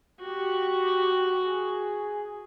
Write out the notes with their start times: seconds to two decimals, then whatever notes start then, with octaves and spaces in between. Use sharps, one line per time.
0.21 F#4 G4
1.41 G#4